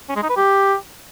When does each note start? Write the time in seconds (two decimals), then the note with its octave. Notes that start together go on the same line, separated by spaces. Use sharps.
0.09 C#4
0.16 G#3
0.23 D#4
0.30 B4
0.36 G4